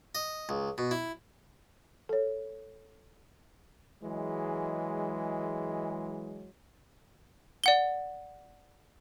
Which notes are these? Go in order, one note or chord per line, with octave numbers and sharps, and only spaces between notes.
D#5
C#2
B2
E4
A4 C#5
E3 F#3 G#3
D5 F#5 G7